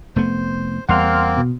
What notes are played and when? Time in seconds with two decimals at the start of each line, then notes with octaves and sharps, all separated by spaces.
0.16 F1 A3 B3 C5
0.89 E2 G3 A#3 C4 F#5 C6 F6
1.37 B2